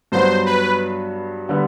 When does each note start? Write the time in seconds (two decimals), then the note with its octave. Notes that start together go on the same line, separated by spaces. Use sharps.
0.12 G2 F#3 B3 F#4 C5
0.46 B4
1.49 D3 G3 B3